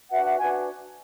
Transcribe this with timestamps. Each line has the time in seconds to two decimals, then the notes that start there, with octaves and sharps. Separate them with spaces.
0.10 D4 F#4 B4 E5 F#5
0.24 E5 F#5
0.38 D4 F#4 B4 F#5 G#5